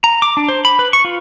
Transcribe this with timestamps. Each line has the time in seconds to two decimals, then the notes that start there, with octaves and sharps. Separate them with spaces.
0.04 A#5
0.22 D6
0.37 D4
0.49 C5
0.65 B5
0.79 B4
0.93 C#6
1.05 F4